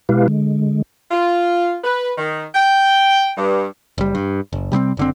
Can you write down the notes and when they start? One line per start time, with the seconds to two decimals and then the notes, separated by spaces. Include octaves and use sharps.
0.09 B2 G#3 E4 G4 B4 F5
0.28 D3 G#3
1.11 F4
1.84 B4
2.18 D#3
2.55 G5
3.37 G2
3.98 F#1 G3
4.15 G2
4.53 F#1
4.72 C3 G3 B3 C4
4.97 F#1 D3 C4